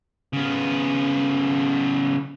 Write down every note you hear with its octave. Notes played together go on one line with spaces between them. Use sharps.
C#3 B3